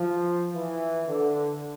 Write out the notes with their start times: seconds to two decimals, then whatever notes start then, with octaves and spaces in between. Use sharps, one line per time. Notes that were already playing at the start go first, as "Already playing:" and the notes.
Already playing: F3
0.53 E3
1.06 D3